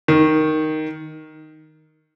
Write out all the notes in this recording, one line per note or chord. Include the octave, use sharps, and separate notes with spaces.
D#3